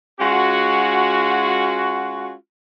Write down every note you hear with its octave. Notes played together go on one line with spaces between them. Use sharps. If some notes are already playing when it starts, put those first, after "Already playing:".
G#3 C#4 F4 F#4